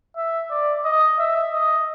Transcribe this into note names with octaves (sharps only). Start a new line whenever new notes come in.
E5
D5
D#5
E5
D#5